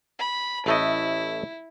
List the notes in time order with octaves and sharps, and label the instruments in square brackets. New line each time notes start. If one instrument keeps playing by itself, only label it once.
[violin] B5
[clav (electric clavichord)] A1 A3 D#5 [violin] E4